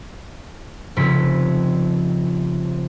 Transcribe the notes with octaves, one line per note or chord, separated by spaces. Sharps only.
F1 F2 C#3 C4 B6